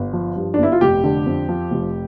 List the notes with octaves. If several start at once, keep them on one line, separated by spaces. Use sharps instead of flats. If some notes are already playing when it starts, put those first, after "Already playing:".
Already playing: G1
F3
G2
D4
G1 E4
F4
F1 G4
D3
F2
F3
F1